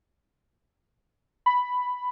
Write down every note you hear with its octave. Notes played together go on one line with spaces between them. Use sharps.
B5